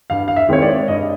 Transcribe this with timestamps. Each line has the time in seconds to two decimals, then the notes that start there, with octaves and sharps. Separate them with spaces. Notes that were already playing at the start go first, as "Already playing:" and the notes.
0.10 G2 F5
0.28 F5
0.36 E5
0.49 D#3 G#3 C4 C#5
0.62 D5
0.88 G2 D#5